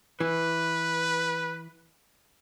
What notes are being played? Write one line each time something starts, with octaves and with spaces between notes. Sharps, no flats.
E3 B4